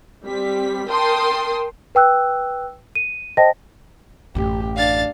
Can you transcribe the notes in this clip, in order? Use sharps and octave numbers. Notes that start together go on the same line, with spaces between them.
G3 C4 B6
A#4 G5 A5 C6 D#6
B4 G5 E6 F#6
D#7
C5 D#5 G5 A5 A#6
A1 F#2 A3 G4
D4 F5 A6